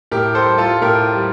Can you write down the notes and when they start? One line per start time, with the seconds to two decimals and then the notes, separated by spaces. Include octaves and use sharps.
0.11 A2 G4 A#4
0.35 A4 C5
0.46 G3
0.58 F4 A4
0.81 A2 G4 A#4
1.16 G3